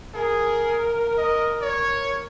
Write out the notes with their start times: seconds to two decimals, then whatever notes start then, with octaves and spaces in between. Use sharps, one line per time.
0.14 G#4 A#4
1.18 D#5
1.62 C#5